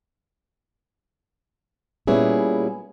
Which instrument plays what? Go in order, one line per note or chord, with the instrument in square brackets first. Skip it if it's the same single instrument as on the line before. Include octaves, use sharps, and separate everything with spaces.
[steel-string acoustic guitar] A#2 G3 B3 C#4 E4 G#4